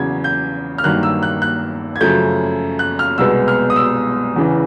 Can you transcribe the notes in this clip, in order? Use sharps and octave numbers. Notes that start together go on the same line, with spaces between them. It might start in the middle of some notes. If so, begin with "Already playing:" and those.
Already playing: E2 C#3 F#3 G#6
G6
F6
G2 D#3 F#3 A#3 F#6
E6
F#6
F#6
G#6
F#2 C#3 F3 A3 G6
F#6
F6
C2 B2 G#3 B3 E6
F6
D#6
E6
E2 C#3 E3